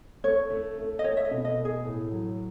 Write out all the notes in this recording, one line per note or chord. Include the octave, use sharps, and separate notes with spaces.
A3 C#5
A3
A3
D#5
A3 C#5
E5
D#5
B2
D#5
A3
G#4
A2
F#3